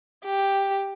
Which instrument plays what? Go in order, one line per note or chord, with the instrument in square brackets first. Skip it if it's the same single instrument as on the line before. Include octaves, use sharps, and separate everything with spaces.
[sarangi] G4